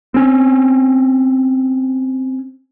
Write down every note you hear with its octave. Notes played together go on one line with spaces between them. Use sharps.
C4 C#4